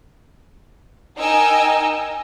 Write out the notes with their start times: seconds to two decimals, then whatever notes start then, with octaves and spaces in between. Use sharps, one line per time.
1.19 D#4 A#4 D#5 G5 G#5 E6